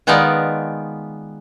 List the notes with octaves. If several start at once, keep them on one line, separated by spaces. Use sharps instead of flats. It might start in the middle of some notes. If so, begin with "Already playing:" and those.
D#3 G#3 B3 D#4 F4 D5